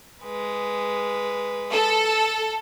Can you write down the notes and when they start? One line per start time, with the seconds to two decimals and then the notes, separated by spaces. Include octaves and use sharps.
0.23 G#3 B4
1.71 A4